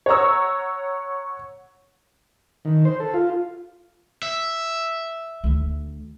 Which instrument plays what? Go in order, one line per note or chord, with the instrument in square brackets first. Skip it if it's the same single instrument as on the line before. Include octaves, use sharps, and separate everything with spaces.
[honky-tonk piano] C#5 F#5 A#5 C#6 E6
[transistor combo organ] D#3
C5
A4
F4
[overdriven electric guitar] E5
[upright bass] D2